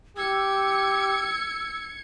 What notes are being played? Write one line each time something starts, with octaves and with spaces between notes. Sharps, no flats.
G4 E6 G#6 C#7